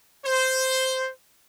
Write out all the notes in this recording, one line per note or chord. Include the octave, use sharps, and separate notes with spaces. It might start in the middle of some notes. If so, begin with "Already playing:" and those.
C5